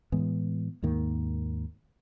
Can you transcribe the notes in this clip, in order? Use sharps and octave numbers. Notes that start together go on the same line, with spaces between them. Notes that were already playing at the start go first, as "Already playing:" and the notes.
A2 E3 G#3 B3
D#2 G#2 D#3 A#3